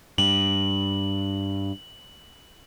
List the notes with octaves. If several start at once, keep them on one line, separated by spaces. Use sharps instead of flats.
G2 F#7